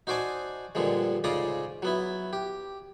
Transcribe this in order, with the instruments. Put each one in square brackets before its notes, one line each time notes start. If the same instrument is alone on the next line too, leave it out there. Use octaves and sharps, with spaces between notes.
[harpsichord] D#4 F#4 C5 D5 G#5 A5
G2 A#2 D3 F3 G#3
G#2 C#3 F4 D5 A#5 D#6
F#3 B3 E4
G4